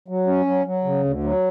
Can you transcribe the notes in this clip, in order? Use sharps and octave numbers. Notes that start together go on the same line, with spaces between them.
F#3
C#4
F#3
F#3
C#3
D2
F#3